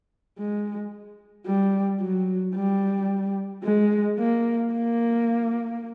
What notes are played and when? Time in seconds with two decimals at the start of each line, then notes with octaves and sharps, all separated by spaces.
0.39 G#3
1.46 G3
2.01 F#3
2.55 G3
3.64 G#3
4.19 A#3
4.73 A#3